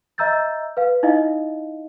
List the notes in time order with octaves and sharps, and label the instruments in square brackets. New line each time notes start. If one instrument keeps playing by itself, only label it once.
[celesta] D#5 E5 A#5 E6 G6 A6
B4 F5
D#4 E4 D#5 F5